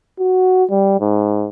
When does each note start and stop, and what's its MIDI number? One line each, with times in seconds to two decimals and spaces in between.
0.19 0.64 66
0.70 0.98 55
1.00 1.49 44